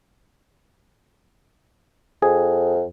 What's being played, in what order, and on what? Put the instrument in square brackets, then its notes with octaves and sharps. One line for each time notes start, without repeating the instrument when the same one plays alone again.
[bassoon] F2 [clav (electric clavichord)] G#4